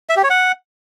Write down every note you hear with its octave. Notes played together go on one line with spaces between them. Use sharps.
E5
G4
C#5
F#5